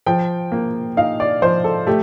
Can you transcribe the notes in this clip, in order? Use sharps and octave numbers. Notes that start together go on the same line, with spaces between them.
F3 G5
A#3
D#4 F5
D5
F3 C5
A4
A3 G4